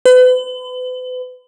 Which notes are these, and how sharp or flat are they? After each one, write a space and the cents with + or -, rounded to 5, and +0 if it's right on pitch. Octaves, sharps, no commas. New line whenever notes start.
B4 +40